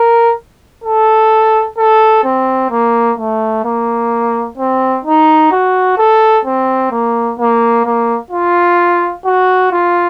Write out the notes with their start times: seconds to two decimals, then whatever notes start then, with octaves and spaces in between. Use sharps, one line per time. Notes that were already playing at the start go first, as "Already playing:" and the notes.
Already playing: A#4
0.84 A4
1.78 A4
2.24 C4
2.71 A#3
3.18 A3
3.65 A#3
4.58 C4
5.05 D#4
5.51 F#4
5.98 A4
6.45 C4
6.91 A#3
7.39 A#3
7.85 A#3
8.31 F4
9.25 F#4
9.72 F4